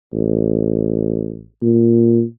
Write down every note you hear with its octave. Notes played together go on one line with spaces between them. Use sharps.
A1
A#2